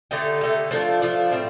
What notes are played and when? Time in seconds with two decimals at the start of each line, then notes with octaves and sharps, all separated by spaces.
0.11 D3 A3 D#4 G4
0.41 D3 A3 D#4 G4
0.71 F3 A3 D4 F4
1.02 F3 A3 D4 F4
1.31 A2 G3 C4